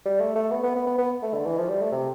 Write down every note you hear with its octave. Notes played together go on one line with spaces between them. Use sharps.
G3
A3
A3
B3
B3
B3
B3
B3
A3
D3
E3
F3
G3
A3
C3